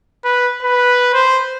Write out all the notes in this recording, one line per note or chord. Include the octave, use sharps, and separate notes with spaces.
B4
B4
C5